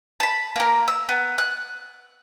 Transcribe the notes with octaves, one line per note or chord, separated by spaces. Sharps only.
A5 B5
A#3 A#4
E6
B3
F#6